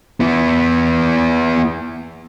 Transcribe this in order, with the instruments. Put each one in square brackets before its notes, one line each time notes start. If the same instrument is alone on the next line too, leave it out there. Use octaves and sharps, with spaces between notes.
[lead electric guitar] B3 E4